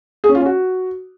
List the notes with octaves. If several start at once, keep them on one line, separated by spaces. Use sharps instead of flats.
G#4
C#4
F4
C#4
F#4